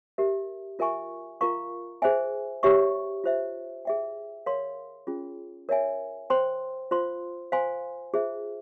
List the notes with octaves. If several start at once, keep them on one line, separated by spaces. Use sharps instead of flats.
G4 A#4 E5
F4 A#4 E5 G#5 C#6
F4 A#4 F5 A#5 C#6
G#4 C5 E5 G#5
G4 C#5 E5 G5 C#6
F4 C5 E5
G#4 E5 G5
A#4 C#5 F5 C6
C#4 F4 G#4
A#4 C#5 E5 G#5
C5 G5 C6
F4 C5 F5 C6
C5 F5 G#5 C6
F4 G#4 C5 E5